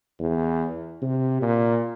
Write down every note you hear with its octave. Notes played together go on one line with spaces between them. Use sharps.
E2
C3
A#2